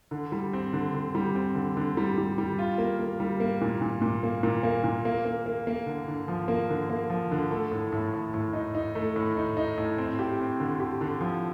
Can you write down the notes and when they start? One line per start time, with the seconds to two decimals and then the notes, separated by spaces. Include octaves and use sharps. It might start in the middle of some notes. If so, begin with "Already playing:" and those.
0.11 D3
0.32 G3
0.53 C4
0.73 D3
0.94 D3
1.15 G3
1.35 C4
1.55 D3
1.77 D3
1.97 G3
2.18 G3
2.38 G3
2.59 F4
2.78 A#3
2.99 A#3
3.20 G3
3.40 A#3
3.61 A#2
3.82 A#2
4.02 A#2
4.23 A#3
4.43 A#2
4.63 A#3
4.84 A#2
5.05 A#3
5.25 A#3
5.46 A#3
5.67 A#3
5.86 D3
6.08 D3
6.28 F3
6.48 A#3
6.70 D3
6.90 A#3
7.10 F3
7.31 D3
7.51 A3
7.72 A2
7.92 A2
8.13 A2
8.34 A2
8.53 D#4
8.75 D#4
8.95 A3
9.16 A2
9.37 D#4
9.57 D#4
9.78 A2
9.98 C4
10.19 G4
10.39 C4
10.60 D3
10.80 G4
11.01 D3
11.21 F3